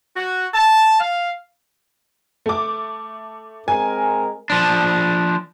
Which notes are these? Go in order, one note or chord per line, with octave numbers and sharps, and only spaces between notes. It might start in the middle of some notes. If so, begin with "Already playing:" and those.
F#4
A5
F5
A3 D6
G#3 C4 A#4 G#5
F3 D4